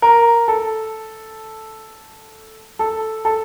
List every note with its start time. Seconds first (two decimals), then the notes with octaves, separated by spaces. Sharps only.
0.02 A#4
0.48 A4
2.79 A4
3.25 A4